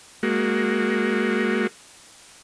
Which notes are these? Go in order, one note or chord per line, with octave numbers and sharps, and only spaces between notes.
G#3 A#3 F#4